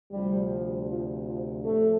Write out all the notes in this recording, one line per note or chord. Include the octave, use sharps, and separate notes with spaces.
D2 C3 F3 G3
F3
F3
A2 F3 A3